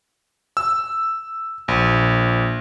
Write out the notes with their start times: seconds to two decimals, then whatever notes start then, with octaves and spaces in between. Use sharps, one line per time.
0.57 E6
1.68 A#1